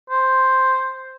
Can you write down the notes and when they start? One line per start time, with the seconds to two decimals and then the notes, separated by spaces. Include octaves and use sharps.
0.10 C5